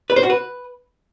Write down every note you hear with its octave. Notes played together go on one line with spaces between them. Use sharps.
B4
C5
F#4
B4